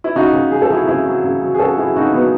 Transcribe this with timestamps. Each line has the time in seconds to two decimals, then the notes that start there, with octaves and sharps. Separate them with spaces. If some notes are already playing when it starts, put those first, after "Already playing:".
0.04 E4
0.16 C#3 D#4 F#4
0.33 C#3
0.51 F#3 G#4
0.62 A4
0.69 F#3 E4 G#4
0.87 C#3 E4 G#4
1.06 F#3
1.24 C#3
1.42 F#3
1.55 G#4
1.59 C#3 F#4 A4
1.78 F#3 E4 G#4
1.96 C#3 D#4 F#4
2.14 F#3 B3